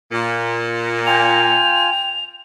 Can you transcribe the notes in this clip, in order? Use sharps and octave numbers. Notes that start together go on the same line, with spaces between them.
A#2
F4 G5 G#5 F7